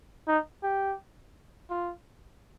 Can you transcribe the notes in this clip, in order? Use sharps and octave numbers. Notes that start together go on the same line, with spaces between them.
D#4
G4
F4